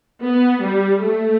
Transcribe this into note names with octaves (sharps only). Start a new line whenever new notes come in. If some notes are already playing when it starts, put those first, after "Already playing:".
B3
G3
A3